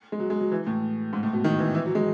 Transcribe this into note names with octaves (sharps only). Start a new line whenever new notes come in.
G#3
F#3
G#3
F#3
E3
A2
G#2
A2
B2
D#3
E3
E3
F#3
G#3